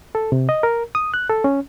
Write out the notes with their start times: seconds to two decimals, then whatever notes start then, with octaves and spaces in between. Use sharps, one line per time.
0.15 A4
0.32 C3
0.49 D#5
0.63 A#4
0.95 D#6
1.14 F#6
1.29 A4
1.44 C#4